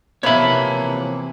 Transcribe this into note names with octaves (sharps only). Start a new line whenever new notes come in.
C3 E3 F3 A#3 B3 C#5 E5 B5